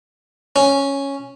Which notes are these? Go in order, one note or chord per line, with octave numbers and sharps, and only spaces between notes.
C#4